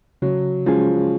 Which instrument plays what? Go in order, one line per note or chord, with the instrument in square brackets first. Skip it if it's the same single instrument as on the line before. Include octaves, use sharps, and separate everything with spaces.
[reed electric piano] C#3 [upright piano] F#3
[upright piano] F3 [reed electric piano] G#3 C#4 G#4